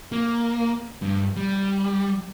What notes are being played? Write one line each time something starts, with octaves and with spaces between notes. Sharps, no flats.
A#3
G2
G3